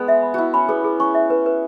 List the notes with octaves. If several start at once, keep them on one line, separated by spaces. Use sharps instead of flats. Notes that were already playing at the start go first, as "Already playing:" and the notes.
Already playing: G#3 B3
E5
B5
E4 F#4 B5
C#4 B5
B3 G#4
G#4
C#4 C#6
E5
B4
B4